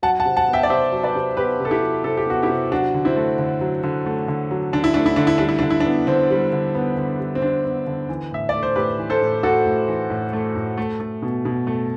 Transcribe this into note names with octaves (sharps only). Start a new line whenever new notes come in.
F#3 F#5 A5
F#5 A5
C3
F#5 A5
B3
E5 G5
D5
C3 C5 E5
F#3
B4 D5
C3
B3 G4 B4
C3
A4
E4 G4
F#3
C3 A4
G4
B3 F#4
E4 G4
C3
F#3 D4 F#4
D3
C4 E4
A3
D3
F#3
D3
A3
D3
F#3
D3 D4
E4
A3 D4
E4
D3 D4
E4
G3 D4
E4
D3 D4
E4
D4
B3
D3 C4
G3
D3
B3
D3
G3
C4
D3 D4
B3
D3
E3
A2 E5
D5
A3
C5
A2 G4 B4
E3
A4 C5
A2
A3 F#4 A4
A2
E3
A2
A3
A2
A3
A3
B2
B2
A3